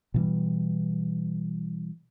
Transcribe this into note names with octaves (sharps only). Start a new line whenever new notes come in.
B2 E3 G3